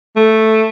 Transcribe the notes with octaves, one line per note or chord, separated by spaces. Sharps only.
A3